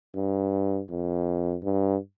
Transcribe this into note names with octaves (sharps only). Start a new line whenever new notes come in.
G2
F2
G2